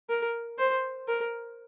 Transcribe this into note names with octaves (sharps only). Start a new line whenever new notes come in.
A#4
C5
A#4